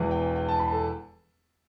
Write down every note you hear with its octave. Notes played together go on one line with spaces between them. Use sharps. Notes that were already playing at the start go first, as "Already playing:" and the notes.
Already playing: E1 E2 E3
G5
G5
A5
B5
A4